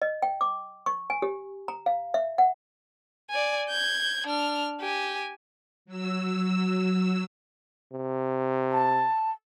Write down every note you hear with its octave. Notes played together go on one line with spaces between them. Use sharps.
D#5
G5
D6
C#6
G#5
G4
A#5
F5
E5
F#5
D5 G#5
G6 G#6
D4 F6
G4 G#5
F#3 E6
C3
A5